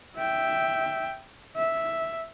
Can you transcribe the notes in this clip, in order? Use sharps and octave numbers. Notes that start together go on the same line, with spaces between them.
E5 G5
E5